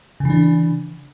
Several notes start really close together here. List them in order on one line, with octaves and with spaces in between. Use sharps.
C#3 E3 D4